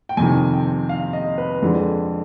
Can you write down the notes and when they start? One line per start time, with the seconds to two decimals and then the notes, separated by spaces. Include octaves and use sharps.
0.09 G5
0.17 F2 C3 D#3 G#5
0.53 G5
0.89 F5
1.13 D#5
1.38 B4
1.62 F2 D3 G#3